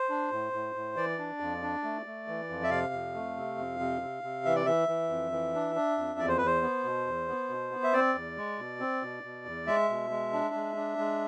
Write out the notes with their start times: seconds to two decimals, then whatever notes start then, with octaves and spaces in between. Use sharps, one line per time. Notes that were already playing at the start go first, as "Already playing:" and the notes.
Already playing: C5
0.10 D4
0.32 A2
0.53 A2
0.75 A2
0.96 E3 D5
1.18 D4
1.40 F2
1.62 D4
1.84 A3
2.06 A3
2.28 E3
2.50 F2
2.63 E5
2.71 C3 F5
2.93 F2
3.14 A3
3.37 C3
3.58 F2
3.80 C3
4.01 C3
4.23 C3
4.45 E3 E5
4.55 D5
4.66 E3 E5
4.88 E3
5.10 F2
5.32 E3
5.54 D4
5.75 D4
5.98 F2
6.19 E2 D5
6.28 C5
6.37 E2 B4
6.46 C5
6.62 B3
6.84 B2
7.07 E2
7.28 B3
7.49 B2
7.71 B3
7.84 E5
7.93 C4 D5
8.15 E2
8.37 G#3
8.59 B2
8.80 C4
9.03 B2
9.24 B2
9.46 E2
9.67 G#3 E5
9.89 B2
10.10 G#3
10.33 D4
10.55 G#3
10.76 D4
10.98 G#3